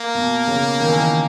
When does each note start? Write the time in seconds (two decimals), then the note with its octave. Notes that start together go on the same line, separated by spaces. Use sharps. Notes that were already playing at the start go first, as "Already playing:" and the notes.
Already playing: A#3
0.15 B2
0.47 C#3
0.80 D#3
0.87 E3
0.95 D#3